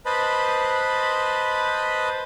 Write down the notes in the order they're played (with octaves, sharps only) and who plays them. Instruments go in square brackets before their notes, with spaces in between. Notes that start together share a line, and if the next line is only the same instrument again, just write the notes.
[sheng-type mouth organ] B4 C5 D#5 A5 B5